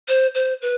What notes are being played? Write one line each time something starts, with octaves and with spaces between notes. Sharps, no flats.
C5
C5
B4